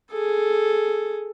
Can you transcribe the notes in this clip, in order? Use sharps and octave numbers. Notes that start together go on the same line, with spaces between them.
G#4 A4